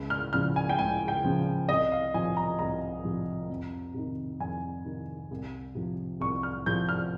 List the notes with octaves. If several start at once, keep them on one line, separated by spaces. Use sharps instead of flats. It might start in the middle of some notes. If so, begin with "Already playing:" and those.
Already playing: C#2
F6
C#3 F3 F6
G#5
G5
C#2 G#5
G5
C#3 F3
C2 D#5
F5
C3 F3 G#5
A#5
C2 A#5
C3 F3
F2
C3 D#3
F2 G#5
C3 D#3
C2
C3 F3
C2 C#6
F6
C3 F3 G6
F6